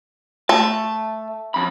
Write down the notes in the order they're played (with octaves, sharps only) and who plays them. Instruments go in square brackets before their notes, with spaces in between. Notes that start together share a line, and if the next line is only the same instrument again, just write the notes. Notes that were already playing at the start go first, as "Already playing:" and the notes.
[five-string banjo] A3 [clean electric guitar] A5
[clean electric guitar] F2 B5